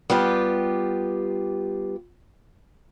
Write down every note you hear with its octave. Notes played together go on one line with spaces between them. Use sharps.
G3 B3 F4 G4